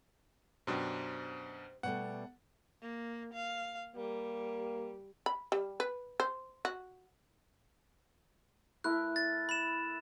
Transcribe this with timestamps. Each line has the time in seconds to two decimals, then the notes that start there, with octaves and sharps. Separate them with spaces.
0.67 F#2 B2 D4 G4 C5
1.83 B2 G3 A3 F#5
2.82 A#3
3.34 F5
3.96 G3 A#3
5.26 B5
5.52 G3
5.80 B4
6.20 C5
6.65 F#4
8.84 A3 E4 A#4 F#6
9.16 A6
9.49 B5 E7